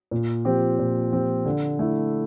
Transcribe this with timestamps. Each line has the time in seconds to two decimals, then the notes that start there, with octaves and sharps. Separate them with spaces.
0.11 A#2
0.45 F3 C4 G4
0.79 A#2
1.12 F3 C4 G4
1.45 D3
1.79 A3 E4